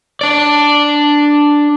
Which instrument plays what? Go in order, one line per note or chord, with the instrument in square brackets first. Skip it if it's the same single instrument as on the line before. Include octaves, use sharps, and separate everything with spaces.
[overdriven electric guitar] D4 D5